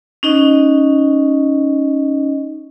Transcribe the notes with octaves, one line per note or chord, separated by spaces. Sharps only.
C#4 D#4 D#5